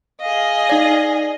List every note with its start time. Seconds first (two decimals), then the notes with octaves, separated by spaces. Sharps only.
0.21 G#4 D#5 F5
0.69 D#4 D5